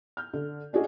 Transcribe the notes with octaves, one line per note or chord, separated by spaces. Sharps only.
F6 G6
D3
C#4 D4 F#4 G#4 D#5